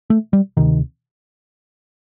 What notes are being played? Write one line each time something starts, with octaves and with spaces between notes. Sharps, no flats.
A3
G3
D2 C3 D#3